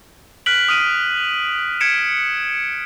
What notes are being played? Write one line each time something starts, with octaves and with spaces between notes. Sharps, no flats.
F6 F#6 B6 D7 F#7
D#6 F6 D7 D#7
F6 G#6 B6 C#7 D7 E7